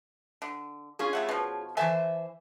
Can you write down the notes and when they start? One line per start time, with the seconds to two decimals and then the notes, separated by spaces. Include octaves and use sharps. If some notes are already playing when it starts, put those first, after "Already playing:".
0.42 D3
0.99 C#4 F4 G#4
1.13 G3 A3 F#5
1.29 B2 F3
1.77 E3 A4 C5 E5 G#5 A5